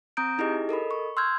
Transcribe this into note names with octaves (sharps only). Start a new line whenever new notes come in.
C4 A#5 D#6 G6 D7
D#4 E4 G4 G#4 D#5
A4 A#4 D#5 B5
C#6
C6 E6 F6 G6 G#6